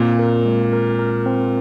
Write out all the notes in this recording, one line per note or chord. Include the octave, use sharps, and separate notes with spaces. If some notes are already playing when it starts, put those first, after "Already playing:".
Already playing: A#2 C4
A#4
G#3
A#4
A#4
C4